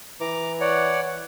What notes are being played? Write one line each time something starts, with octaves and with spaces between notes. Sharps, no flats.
E3 A#5 D6
C#5 D5 F#5